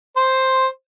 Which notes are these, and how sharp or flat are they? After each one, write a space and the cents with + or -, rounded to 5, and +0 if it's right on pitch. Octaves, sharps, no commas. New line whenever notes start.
C5 +5